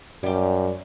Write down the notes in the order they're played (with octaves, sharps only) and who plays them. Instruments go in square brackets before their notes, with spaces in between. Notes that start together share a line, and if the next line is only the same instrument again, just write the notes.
[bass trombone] F#2 [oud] G3 G4